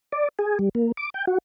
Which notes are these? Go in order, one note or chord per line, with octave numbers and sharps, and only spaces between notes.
D5
G#4
G3
A#3
D6
G5
F#4